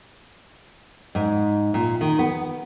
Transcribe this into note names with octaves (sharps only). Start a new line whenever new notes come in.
G#2
A#2
D#3
B3